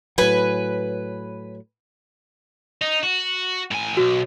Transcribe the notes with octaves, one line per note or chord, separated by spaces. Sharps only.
A2 F#3 B4 G#5
D#4
F#4
A2 G#5
B1 F#4